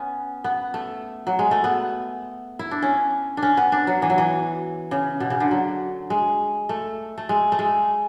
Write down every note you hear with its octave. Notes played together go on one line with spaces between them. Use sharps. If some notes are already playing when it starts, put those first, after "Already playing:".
Already playing: B3 C#4
B3
A3
F#3
G#3
A3
B3
E4
D4
C#4
D4
C#4
B3
D4
F#3
E3
F#3
E3
C#3
B2
C#3
D3
F#3
G#3
A3
A3
G#3
A3
G#3